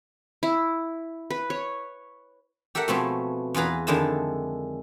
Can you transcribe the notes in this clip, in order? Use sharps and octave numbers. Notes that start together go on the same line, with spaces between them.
E4
B4
C#5
G4 A4 A#4 E5 F#5
B2 F3 A3 B3 C4 G#4
E2 F4 G#4 B4 A#5
F2 D3 D#3 G#3 E4 A5